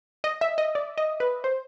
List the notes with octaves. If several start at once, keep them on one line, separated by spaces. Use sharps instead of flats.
D#5
E5
D#5
D5
D#5
B4
C5